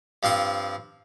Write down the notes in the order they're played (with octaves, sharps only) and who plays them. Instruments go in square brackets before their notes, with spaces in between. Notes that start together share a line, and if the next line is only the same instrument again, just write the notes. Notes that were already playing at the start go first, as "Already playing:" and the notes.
[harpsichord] G2 F3 C4 C6